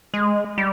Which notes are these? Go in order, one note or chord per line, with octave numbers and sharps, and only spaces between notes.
G#3
G3